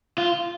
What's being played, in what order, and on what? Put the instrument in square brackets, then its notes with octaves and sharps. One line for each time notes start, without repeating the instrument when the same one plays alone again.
[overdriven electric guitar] F4